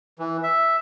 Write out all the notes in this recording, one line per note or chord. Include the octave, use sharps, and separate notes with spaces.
E3
E5